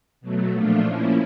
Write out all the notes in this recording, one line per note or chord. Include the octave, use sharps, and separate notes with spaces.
B2 F#3 A3
A#2 F3 A3 D4 F4
F3 A#3 C#4 E4